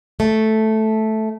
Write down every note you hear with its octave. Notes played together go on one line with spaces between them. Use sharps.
A3